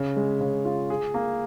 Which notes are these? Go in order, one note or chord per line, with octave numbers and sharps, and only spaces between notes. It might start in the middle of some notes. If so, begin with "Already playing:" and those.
Already playing: C#3
G#3
C#3
F4
G#4
A#3